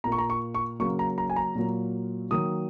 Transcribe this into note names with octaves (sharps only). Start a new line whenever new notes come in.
A#2 A#3 A#5
C#6
A#5
C#6
C#6
C#3 F#3 A#3 C#6
A#5
A#5
G#5
A#5
A#2 F#3 A#3
D#3 F#3 A#3 D#6